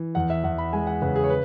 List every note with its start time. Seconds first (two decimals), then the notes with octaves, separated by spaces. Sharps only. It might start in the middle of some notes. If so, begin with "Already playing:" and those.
Already playing: E3
0.15 E2 F#5
0.30 E5
0.44 E2 F#5
0.58 B5
0.73 G#3 G#5
0.87 F#5
1.02 C#3 B4
1.16 G#4
1.24 C#5
1.30 B4